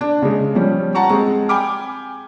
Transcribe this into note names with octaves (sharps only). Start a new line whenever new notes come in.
D4
C#3 G#3
F3 G3 C#4
F#5 A5 A#5 C#6
G#3 C4
G5 G#5 B5 D6 F6